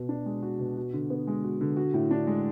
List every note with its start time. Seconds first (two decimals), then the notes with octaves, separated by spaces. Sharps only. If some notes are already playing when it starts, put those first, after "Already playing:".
Already playing: B2 F#4
0.09 D4
0.26 G#3
0.42 F#4
0.59 B2
0.77 F#4
0.93 D3
1.10 B3
1.27 G#3
1.44 F#4
1.61 D3
1.77 F#4
1.94 A2
2.11 D4
2.27 G#3